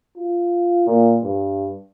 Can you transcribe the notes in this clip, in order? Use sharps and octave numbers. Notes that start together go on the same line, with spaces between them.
F4
A#2
G2